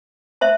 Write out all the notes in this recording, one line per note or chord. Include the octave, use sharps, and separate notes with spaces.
C5 E5 A5